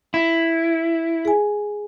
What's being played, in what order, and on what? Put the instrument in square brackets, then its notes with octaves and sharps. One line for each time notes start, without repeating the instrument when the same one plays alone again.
[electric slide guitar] E4
[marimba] G#4 G#5